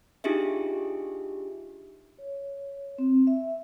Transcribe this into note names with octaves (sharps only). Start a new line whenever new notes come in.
D4 D#4 F4 G4 G#4 E5
C#5
C4
E5